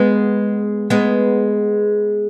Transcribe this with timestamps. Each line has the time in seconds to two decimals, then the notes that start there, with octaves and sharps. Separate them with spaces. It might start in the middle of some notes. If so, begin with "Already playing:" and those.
Already playing: G#3 B3
0.90 G#3 B3